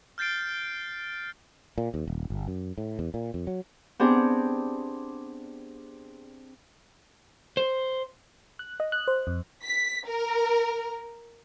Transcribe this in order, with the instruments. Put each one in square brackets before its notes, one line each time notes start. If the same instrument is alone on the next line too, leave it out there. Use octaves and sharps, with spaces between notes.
[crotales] F6 G6 A6 C7 D7
[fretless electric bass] A#2
D#2
D#1
G1
F#2
A2
E2
A#2
F2
F#3
[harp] B3 C4 D4 G4 G#4
[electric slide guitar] C5
[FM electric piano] F#6
D#5
F#6
C5
F2
[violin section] B6
A#4